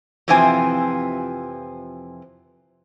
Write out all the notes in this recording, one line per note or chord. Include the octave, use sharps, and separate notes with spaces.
F2 C3 E3 F3 C4 G#5